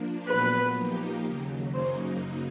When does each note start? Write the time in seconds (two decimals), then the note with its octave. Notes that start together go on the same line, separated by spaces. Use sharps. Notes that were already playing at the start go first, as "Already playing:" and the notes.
Already playing: F3 A#3 D4
0.28 A#2 F#3 B3 B4
0.76 F3 A#3 D#4 G4
1.25 D#2 C#3 F#3
1.74 F#2 C#3 F#3 A#3 D#4 C5